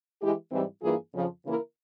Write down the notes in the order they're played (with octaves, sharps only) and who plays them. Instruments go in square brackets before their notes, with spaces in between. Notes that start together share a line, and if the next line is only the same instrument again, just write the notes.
[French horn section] E3 G#3 E4 G4
G#2 E3 G3 C4 E4
G2 E3 A#3 F4 G#4
F2 C#3 F3
C#3 E3 A#3 E4 A#4